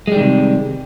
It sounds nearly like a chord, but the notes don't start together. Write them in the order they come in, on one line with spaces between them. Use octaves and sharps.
G#3 G3 D#3 C3